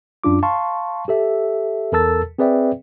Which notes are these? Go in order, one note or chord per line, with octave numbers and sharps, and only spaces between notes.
F#2 D4 F4 D6
F5 A5 C6 C#6
G4 A4 E5
E2 A4 A#4 A5 E6 A6
C4 G#4 B4 D5 E5 G5